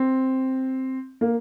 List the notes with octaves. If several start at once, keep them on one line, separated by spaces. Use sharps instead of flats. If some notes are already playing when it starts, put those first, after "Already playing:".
Already playing: C4
A#3